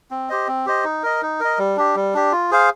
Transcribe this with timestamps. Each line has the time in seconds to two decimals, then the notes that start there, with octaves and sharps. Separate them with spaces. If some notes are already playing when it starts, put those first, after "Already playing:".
0.11 C4
0.29 G4 C5 D#5
0.48 C4
0.66 G4 C5 D#5
0.84 D#4
1.03 A#4 D#5
1.22 D#4
1.40 A#4 D#5
1.59 G3
1.77 D4 G4
1.96 G3
2.14 D4 G4
2.32 F4
2.51 G#4 C5 F5